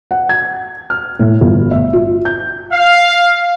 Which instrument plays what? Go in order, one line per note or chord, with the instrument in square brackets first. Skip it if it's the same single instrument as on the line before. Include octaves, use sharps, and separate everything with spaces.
[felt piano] F#5
G#6
F6
A2
G1
E5
F4
G6
[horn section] F5